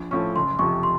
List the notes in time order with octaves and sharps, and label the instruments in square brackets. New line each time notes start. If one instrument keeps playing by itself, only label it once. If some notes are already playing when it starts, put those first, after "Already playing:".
Already playing: [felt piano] A#1
[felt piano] A2 F3 A3 C#4 [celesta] C#6
[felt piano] F#1 [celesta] C6
[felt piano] F2 C3 F3 [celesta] C#6
[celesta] C6